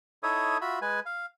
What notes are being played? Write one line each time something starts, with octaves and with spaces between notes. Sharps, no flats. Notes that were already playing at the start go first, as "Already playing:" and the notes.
D#4 E4 A4 C#5 E5 D#6
F4 F#4 E5 B5
G#3 B4 G#5
F5